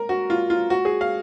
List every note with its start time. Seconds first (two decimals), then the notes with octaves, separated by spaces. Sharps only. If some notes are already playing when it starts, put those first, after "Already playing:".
Already playing: A#4
0.09 F#4
0.30 F4
0.50 F4
0.70 F#4
0.85 G#4
1.01 F5